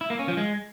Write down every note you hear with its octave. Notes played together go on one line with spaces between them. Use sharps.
E4
A#3
C#4
F3
G#3